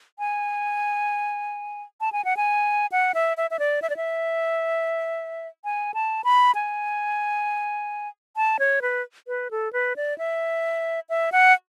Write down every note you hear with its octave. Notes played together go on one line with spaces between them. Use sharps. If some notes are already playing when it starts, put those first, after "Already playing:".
G#5
A5
G#5
F#5
G#5
F#5
E5
E5
E5
D5
E5
D5
E5
G#5
A5
B5
G#5
A5
C#5
B4
B4
A4
B4
D5
E5
E5
F#5